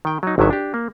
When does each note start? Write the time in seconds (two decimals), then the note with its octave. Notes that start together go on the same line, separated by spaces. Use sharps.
0.05 D#3 G5
0.23 F#3 D#4
0.38 G#1 D3 D#3 F#3 E5
0.50 D4 G4
0.74 A#3